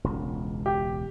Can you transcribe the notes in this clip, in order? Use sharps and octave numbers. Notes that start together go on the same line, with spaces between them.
E1 C#2
G4